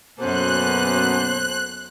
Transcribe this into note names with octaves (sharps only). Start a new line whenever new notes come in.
F#2 B2 A#3 B3 C#4 A4 C5 F#6